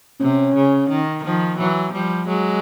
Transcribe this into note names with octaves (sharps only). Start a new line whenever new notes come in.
C3 C#4
C#3
D#3
D#3 F3
E3 F#3
F3 G3
F#3 G#3